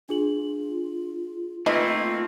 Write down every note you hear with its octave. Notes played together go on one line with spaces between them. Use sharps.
D4 F4 G#4 F#7
A3 A#3 C4 D#4 F4 B4 D#5 C7